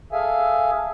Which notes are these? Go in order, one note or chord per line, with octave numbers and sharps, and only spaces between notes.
G#4 A4 E5 F5 G#5